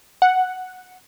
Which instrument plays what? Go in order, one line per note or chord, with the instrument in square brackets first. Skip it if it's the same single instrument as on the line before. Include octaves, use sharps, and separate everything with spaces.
[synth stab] F#5